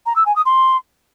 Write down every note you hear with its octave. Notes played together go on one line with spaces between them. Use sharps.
A#5
E6
G#5
D#6
C6